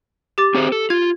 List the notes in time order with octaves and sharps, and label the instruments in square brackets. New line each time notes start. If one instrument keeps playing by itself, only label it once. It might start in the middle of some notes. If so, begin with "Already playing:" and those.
[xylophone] G4 D6 A6
[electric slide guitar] C4 G#4 C5
A4
[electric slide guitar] F4 [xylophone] G#6